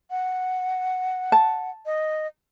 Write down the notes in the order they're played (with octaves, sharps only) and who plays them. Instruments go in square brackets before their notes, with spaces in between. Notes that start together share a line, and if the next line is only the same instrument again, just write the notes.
[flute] F#5
[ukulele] A5
[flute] D#5